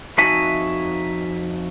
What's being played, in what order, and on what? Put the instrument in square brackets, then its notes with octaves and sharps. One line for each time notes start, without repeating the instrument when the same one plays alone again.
[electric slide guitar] F2 D#4 F#4 E5 G#5 A5